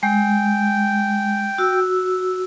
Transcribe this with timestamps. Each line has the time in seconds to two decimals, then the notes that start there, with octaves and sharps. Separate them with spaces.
0.03 G#3 G5
1.58 F#4 E6